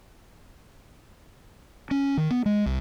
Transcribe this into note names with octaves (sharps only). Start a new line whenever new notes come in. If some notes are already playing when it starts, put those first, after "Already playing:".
C#4
D#3
B3
G#3
C2